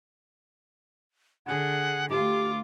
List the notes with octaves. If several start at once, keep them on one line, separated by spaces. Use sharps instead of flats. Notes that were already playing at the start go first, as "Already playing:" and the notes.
D3 G#4 F#5
D2 F4 G4 D6